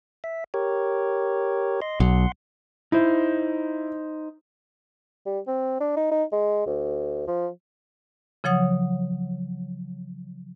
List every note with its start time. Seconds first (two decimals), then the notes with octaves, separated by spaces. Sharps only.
0.24 E5
0.54 G4 A#4 C#5
1.82 D#5 C6
2.00 B1 F#5 C6
2.92 D#4 E4 C5
5.26 G3
5.47 C4
5.80 D4
5.97 D#4
6.11 D#4
6.32 G#3
6.66 D2
7.27 F3
8.44 C#3 F3 F#3 C#5 F#5 D#6